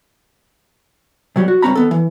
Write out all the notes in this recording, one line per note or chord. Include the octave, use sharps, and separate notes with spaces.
C3 F#3 G3
F#4
C#2 G2 C4 C#4 A#5 B5
D#3 B3 A4
E3